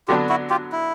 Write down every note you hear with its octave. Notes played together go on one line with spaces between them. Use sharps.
D3 F#3 B3 D4 F4 G4
E4 F#4
F4 G4
E4